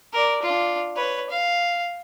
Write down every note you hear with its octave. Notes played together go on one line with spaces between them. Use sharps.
A#4 D5
D4 F4
B4 C#5
F5